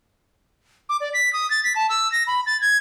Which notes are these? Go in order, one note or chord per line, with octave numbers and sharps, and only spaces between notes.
D6
D5
B6
D#6
A6
B6
A5
E6
A#6
B5
A6
G#6